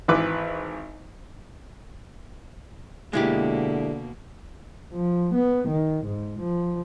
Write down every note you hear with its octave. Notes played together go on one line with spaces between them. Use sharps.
G#1 E3 B4 D6
B2 D3 G#3 A#3 E4 G4
F3
B3
D#3
G#2
F3